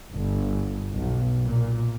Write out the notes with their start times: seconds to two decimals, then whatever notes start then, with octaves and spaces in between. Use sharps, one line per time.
0.13 G1
0.93 B1
1.45 A#2